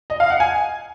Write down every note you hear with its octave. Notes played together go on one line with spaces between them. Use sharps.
D#5
F5
F#5
G#5